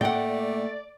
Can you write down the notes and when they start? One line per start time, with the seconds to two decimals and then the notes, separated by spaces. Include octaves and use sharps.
0.01 A2 A3 A#3 D5 F#5 G5